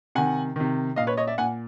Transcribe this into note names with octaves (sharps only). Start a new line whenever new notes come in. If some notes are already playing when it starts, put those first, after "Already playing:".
C3 D#3 F#5 G#5
C3 D#3
A#2 D#5 F5
B4 C#5
C#5 D#5
D5 E5
A#2 F#5 G#5